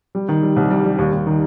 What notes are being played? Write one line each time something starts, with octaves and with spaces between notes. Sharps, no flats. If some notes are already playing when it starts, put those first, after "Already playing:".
G3
D#3
G3
C2
G3
G3
D#2
D#2
D#3